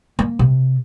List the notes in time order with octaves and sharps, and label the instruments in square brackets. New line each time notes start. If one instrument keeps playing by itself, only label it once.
[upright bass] A#3
C3